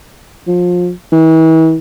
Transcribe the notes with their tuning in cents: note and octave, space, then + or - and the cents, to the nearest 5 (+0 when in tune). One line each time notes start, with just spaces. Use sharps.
F3 +30
E3 -40